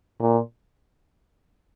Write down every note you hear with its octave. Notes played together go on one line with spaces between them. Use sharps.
A#2